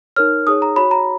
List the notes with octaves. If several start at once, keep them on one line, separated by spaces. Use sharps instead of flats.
D#4 A#4 C#5 F6
D#4 G#4 C#5 D#6
A#5
F#4 C#5 B5
A#5